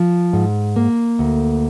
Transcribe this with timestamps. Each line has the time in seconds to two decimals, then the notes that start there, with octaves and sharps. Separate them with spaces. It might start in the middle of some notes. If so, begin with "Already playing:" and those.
Already playing: F3
0.33 G#2
0.76 A#3
1.19 D2